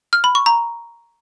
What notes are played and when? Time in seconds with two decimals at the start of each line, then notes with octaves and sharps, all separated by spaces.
0.13 F6
0.24 B5
0.35 C#6
0.46 A#5